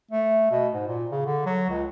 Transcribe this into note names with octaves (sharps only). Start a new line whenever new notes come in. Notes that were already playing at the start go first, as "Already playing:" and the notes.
A3
B2
G#2
A#2
C#3
D3
F#3
C#2